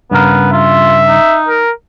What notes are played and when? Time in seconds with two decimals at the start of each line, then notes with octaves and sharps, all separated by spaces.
0.11 G2 C#3 B3 A#4
0.52 F4 E5
1.08 D#4
1.48 A#4